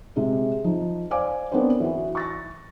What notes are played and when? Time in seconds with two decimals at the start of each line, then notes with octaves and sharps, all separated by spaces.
0.16 C3 G#3
0.64 F3 D#4
1.11 C5 D5 F5 G#5 D6
1.51 B3 C4 D4 A#4 C5 C#5
1.80 E3 F#4
2.15 C#6 A6 A#6